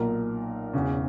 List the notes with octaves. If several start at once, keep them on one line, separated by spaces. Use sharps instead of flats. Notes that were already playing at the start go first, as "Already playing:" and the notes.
Already playing: B1 A#2 A#4
E1 E2 C#3